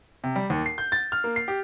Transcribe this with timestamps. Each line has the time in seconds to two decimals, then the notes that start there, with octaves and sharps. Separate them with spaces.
0.24 C3
0.36 G3
0.50 D#2
0.66 C7
0.78 G6
0.92 A6
1.12 F6
1.24 A#3
1.36 C7
1.48 G4